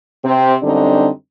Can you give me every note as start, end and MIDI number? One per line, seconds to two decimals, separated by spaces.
0.24 0.54 48
0.24 0.54 60
0.62 1.08 42
0.62 1.08 50
0.62 1.08 55
0.62 1.08 60
0.62 1.08 62
0.62 1.08 63